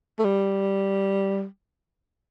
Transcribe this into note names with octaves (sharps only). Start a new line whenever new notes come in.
A3
G3